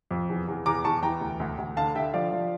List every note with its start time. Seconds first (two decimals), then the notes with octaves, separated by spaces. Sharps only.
0.11 F2
0.29 E2
0.48 E2
0.66 E2 A#5 D6
0.84 E2 A5 C#6
1.03 E3 G5 A#5
1.21 D2
1.40 D2
1.58 D2
1.77 D3 F5 A5
1.95 D3 E5 G5
2.14 F3 D5 F5
2.32 F3